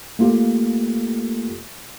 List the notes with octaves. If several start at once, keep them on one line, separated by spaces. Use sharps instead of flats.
A3 A#3 F4 G4 A4